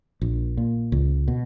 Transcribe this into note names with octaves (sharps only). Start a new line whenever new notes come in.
A#1
A#2
C#2
B2